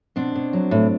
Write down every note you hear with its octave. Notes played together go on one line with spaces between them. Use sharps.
B2 C4 D4
B2
F#3
A2